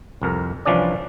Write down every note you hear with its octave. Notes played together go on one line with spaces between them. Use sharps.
C2 F2 A#4
C2 E3 F3 C#4 D4 D5